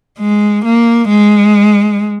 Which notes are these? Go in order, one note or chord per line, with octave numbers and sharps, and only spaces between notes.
G#3
A#3
G#3